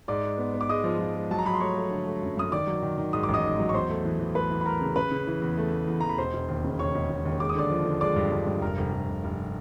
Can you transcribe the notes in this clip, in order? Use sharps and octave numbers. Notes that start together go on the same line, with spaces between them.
G#2 D5 D6
G#3
B3
B3
D6
G#3 D#5 D#6
F3
F3
G#3
F#3 A5
A#5
F#3 B5
C6
A3 C#5 C#6
A3
D3
A3
F#2
F#2 D#6
D#3 D5 D6
F#3
D#3
D#3
G#2 D#6
D6
A1
D#5 D#6
G#2
F#3
C#6
E2 C5 C6
A3
E3
E3
A3 B4 B5
E3
B5
A3 A#4 A#5
C#3
C#3 B4 B5
C#3
E3
E2
A3
A3
E2
E2 A#5
B5
E1 C5 C6
E1
D#2
C#3
D#2 C#5 C#6
E1
E1
D#2
G#3 D6
D#6
D3 D5 D6
F3
D3
G#3 D5 D6
G2
G2
G2
F1 A#4 A#5
F1
F1
F1
F1